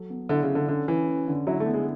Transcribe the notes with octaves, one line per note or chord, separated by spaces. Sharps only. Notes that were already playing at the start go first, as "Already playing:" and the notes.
Already playing: F#3 A4
B3
D3 E4
C#3
A4
D3
D3 C#4
E3 C#4
C#4
D3
F#3 E4
A3
B3
G#3